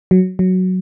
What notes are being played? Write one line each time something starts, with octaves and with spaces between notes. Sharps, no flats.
F#3
F#3